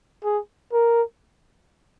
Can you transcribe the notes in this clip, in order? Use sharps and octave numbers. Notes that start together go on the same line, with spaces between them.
G#4
A#4